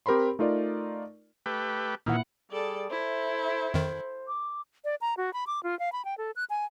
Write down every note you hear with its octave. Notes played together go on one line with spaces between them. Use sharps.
C4 G4 A#4 C5 B5 C6
A3 D#4 F4 A#4 D5
A3 G4 B4
A#2 D#3 E3 A#3 E4 F#5
G3 G#4 A4 D5
E4 A4 C5 E5
F2 D#3 C5
D6
D5
A#5
F#4
B5
D6
F4
F5
B5
G5
A4
F#6
G#5